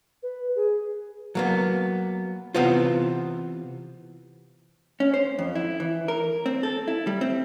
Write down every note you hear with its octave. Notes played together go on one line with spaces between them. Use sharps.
B4
G#4
F#3 A#3 B3
C3 E3 B3 C4 F4
C#4
C5
F2
E4
E3
A#4
C4
A4
E4
G3
C4